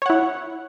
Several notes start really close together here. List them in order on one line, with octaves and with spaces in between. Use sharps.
C#5 F#5 E4